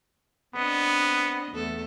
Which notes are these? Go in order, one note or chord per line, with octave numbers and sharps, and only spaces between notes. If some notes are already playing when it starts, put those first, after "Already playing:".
B3 C4 D4 D#5
E2 A3 A4